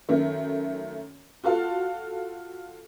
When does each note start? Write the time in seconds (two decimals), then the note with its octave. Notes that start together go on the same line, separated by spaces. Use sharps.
0.09 F#2 D#3 A3
1.44 F4 F#4 A4 F5 A5